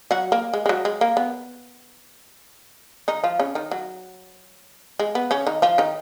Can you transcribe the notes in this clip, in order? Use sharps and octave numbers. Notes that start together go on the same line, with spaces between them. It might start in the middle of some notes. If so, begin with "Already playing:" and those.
F#3 F#4
A#3
G#3
G#3
F#3
G#3
A#3
B3
D#3 D#4
F3 F4
C#3 C#4
D#3 D#4
F#3
G#3
B3
C#3 C#4
D#3 D#4
F3 F4
D#3 D#4